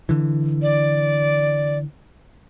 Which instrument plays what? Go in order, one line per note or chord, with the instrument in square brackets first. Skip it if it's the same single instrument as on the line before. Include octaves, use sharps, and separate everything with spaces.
[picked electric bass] D3 E3
[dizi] D5